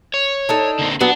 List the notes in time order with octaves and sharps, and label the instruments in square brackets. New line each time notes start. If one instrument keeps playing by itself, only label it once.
[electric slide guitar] C#5
[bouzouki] D4 D#4 A4
[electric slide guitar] D3 A#3 C4
[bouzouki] F#3 B3 [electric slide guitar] D4